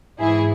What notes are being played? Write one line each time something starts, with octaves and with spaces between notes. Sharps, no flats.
G#2 E3 E4 G#4